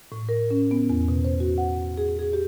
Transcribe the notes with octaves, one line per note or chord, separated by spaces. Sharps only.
A2
A#4
C#4
B3
E2
B2
C5
F#4
F#5
G#4
G#4
G4